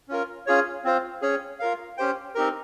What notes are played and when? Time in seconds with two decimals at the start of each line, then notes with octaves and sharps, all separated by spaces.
0.08 C#4 F4 A#4
0.46 C#4 F4 G#4 C#5
0.84 C4 F4 C5
1.22 C#4 G#4 C#5
1.59 F4 A#4 F5
1.97 C#4 G4 C5 G5
2.35 C4 D#4 G4 A#4